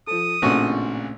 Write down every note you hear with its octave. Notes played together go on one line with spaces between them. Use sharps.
F3 A4 D#6
A1 A#2 C#3 A3 C4 D4 F#4 C#6